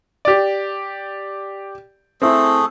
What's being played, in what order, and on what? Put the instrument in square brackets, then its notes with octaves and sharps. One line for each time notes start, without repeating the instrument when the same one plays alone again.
[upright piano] G4 D5
[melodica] A3 G#4 A4 [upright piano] C4 E4